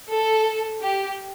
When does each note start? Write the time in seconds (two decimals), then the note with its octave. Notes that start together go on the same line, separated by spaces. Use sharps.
0.10 A4
0.81 G4